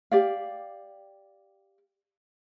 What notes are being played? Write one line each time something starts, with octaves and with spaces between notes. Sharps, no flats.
G4 D5 F5